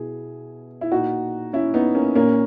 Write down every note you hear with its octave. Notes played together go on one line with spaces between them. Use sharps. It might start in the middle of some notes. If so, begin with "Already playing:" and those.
Already playing: B2 E4 G#4
E4
A#2 D#4 F#4
C#4 E4
B3 D#4
A#3 C#4
A#2 A#3 C#4